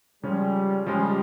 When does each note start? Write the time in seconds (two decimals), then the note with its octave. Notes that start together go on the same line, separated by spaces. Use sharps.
0.23 C#3 F3 G3 G#3 C#4
0.86 C#3 F3 G3 G#3 C#4